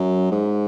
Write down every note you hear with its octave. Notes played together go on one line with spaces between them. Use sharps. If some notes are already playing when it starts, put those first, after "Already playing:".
Already playing: F#2
G#2